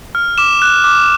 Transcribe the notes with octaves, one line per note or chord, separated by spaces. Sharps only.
F6
D6 E7
F#6
D6